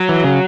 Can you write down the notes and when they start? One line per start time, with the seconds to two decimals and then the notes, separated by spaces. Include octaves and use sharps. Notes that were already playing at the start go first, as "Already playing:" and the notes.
Already playing: F#3
0.09 E3
0.24 C#3